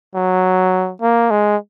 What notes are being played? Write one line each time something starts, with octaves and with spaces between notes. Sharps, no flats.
F#3
A#3
G#3